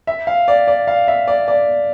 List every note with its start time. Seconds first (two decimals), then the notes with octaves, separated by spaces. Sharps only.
0.07 E5
0.27 F5
0.48 D5
0.67 D5
0.87 F5
1.08 E5
1.28 D5
1.48 D5